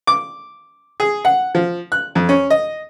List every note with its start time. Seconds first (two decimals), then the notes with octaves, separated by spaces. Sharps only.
0.07 D6
1.00 G#4
1.25 F#5
1.55 F3
1.92 F#6
2.15 F2
2.29 C#4
2.50 D#5